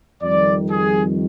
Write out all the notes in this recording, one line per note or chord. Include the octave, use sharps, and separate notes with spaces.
F2 D#3 G3 D5
G#4